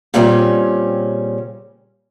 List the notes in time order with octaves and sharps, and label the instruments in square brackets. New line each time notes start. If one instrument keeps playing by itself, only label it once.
[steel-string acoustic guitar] A#2 C#3 G3 C4 C#4